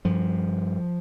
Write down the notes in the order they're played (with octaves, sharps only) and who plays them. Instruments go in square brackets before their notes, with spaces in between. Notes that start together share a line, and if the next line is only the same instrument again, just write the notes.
[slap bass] G2 F3